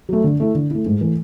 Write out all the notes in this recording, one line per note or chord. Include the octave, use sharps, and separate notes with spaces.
F#3 A3
D3
A3 E4
D3
A3 E4
G#2
E3 A3